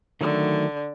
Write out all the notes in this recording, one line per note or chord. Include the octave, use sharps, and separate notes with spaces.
D3 D#3 F#3 A3